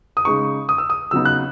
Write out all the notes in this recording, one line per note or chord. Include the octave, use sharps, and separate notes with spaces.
D#6
C#3 G#3 D#4 C#6
D#6
E6
D#6
C#3 F#3 B3 D#4 E6
F#6